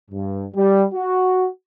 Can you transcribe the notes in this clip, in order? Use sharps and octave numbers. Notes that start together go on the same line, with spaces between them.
G2
G3
F#4